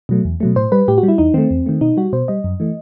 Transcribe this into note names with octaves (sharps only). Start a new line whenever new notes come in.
B2 F#3 A3
E2
B2 F#3 A3
A2 C5
G3 B4
A2 G4
F#4
G3
E4
E2 D#4
D#3 A3 C4
E2
D#3 A3
B2 D#4
G3 F#4
B2 C5
G3 D#5
F#2
E3 A3